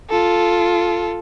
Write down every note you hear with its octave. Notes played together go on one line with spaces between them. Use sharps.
F4 A4